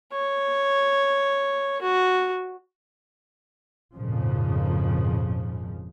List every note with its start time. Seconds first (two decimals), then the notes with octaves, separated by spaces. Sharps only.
0.12 C#5
1.82 F#4
3.95 G#1 F2 A#2 C#3 F3